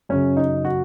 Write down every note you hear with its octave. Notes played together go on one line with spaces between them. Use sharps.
F#2 C#3 C#4
D#4
F#4